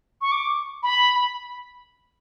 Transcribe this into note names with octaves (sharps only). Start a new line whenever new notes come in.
C#6
D6
B5